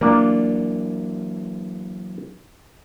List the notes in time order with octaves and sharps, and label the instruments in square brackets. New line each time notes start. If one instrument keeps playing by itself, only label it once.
[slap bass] E3 F#3 [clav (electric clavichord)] A#3 D4 F4